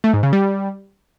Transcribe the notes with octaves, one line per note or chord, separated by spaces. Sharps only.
A3
G#2
C#3
G3